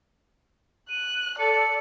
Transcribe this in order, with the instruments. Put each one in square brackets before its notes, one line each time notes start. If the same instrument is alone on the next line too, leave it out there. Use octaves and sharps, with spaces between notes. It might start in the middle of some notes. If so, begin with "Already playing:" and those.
[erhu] F#6 [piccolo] D#7
[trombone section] A4 [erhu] D5 [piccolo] C#7